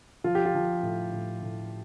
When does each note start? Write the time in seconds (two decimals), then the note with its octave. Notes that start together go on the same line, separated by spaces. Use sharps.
0.24 F3 F4
0.35 G4
0.45 F4
0.55 F3
0.83 A2
1.13 A2
1.42 A2